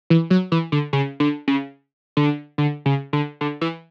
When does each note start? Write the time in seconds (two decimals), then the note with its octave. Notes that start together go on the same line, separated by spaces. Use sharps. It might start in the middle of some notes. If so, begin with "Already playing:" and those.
0.10 E3
0.30 F#3
0.52 E3
0.72 D3
0.93 C#3
1.20 D3
1.48 C#3
2.17 D3
2.58 D3
2.86 C#3
3.13 D3
3.41 D3
3.61 E3